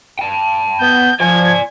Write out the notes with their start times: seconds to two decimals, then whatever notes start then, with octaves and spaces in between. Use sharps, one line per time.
0.19 G5 A5
0.81 B3 G6
1.20 F3 D5 G#5 G#6